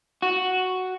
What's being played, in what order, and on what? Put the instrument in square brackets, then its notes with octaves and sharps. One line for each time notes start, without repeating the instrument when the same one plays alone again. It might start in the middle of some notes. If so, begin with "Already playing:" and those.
[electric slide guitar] F#4